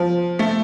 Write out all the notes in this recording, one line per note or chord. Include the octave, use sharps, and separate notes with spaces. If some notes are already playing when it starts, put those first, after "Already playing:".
Already playing: F3
A3